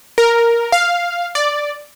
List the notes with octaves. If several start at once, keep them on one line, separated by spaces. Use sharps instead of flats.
A#4
F5
D5